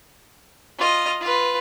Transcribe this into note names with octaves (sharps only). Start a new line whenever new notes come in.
F4 D#5
F4 B4